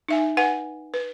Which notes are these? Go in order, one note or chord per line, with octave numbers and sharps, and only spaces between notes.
D#4 E5 G#5
B4 F#5 G#5
B4